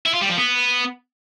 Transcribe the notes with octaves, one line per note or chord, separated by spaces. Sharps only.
E4
F4
G3
F3
B3